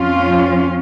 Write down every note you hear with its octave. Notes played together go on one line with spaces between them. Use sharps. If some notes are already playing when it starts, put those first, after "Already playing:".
Already playing: F2 F3 C#4 F4